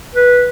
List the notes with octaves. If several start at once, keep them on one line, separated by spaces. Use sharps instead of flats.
B4